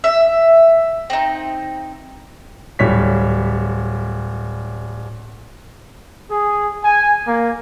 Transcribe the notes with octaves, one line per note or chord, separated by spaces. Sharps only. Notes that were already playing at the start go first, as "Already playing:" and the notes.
E5
C4 D#4
D1 G3 C#5 B6
G#4
G#5
A#3